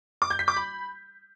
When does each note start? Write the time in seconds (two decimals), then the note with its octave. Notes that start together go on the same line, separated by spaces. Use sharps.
0.22 D6
0.30 G6
0.39 B6
0.48 D6
0.57 B5